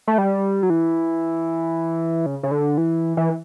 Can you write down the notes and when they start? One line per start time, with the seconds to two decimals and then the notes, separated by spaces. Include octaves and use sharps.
0.07 A3
0.18 G3
0.63 F#3
0.70 E3
2.26 C#3
2.43 C#3
2.51 D3
2.78 E3
3.17 E3